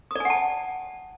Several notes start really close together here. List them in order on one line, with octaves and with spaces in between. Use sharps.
D#6 D5 G#5 F#5 A5